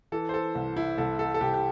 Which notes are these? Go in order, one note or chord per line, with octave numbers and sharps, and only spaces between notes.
E3 A4
C5
A4
C2
E4
C2 A4
A4
A4
C2 G4
G4